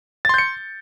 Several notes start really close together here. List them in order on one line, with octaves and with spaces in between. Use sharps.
A6 C6 G6 C#7